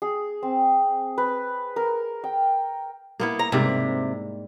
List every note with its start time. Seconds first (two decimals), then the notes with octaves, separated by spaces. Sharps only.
0.02 G#4
0.43 C4
1.18 B4
1.76 A#4
2.24 G5
3.20 A#3 B3 E4
3.39 A#5
3.52 G#2 C3 G3 A#3